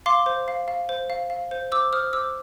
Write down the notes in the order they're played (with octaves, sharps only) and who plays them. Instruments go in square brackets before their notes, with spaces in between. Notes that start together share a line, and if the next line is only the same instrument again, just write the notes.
[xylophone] F5 C6 D6
C5
F5
F5
C5
F5
F5
C5
C5 D6 E6
C5 D#6 F6
C5 D6 E6